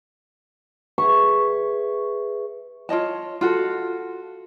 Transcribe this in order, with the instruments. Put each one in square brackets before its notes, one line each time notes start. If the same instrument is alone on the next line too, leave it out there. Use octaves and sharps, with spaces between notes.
[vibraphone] G#4 B4 E5 [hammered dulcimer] C#6
[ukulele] F4 C#5 D#5 A5
F4 F#4 A4